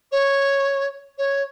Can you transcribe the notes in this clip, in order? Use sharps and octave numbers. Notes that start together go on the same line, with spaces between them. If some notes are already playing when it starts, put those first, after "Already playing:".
C#5
C#5